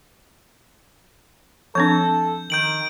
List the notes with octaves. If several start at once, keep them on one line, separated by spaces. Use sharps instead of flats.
F3 C4 D4 A4 G6
D#3 G6 D7 F#7